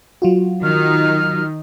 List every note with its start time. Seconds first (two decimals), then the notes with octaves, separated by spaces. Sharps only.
0.22 F#3 F4 F#4
0.63 D#3 D#4 F6